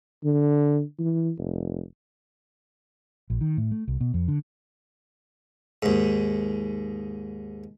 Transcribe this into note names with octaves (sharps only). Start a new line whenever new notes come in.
D3
E3
F1
A#1
D#3
A2
A3
C2
B2
F2
D3
D#2 G#2